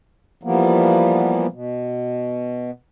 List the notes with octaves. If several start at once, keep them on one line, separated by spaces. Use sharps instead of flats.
E3 F3 G3 A#3 B3
B2